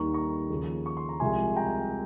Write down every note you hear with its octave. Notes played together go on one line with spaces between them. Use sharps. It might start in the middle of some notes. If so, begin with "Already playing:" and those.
Already playing: D#2 D#3 G3 A#5 C#6
A#5 C#6
D#2 C#3 F3
C#6
C6
A#5
C2 C3 F3 G#3 G#5 C6
G5 A#5